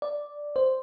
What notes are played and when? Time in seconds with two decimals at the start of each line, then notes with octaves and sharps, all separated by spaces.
0.02 D5
0.56 C5